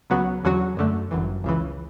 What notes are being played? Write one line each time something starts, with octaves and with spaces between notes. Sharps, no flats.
C#2 C#3 F#3 B3 F#4
E2 D3 F#3 C#4 F#4
F#2 D3 A3
G1 F#2 E3
C#2 C#3 E3